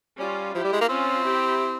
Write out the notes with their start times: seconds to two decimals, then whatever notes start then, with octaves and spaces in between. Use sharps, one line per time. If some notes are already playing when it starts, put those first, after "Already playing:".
0.19 G3 C#4 F4
0.54 F3 E4 G4
0.64 G3
0.73 G#3
0.81 A#3
0.89 C4 C#4 F4
1.25 E4 G4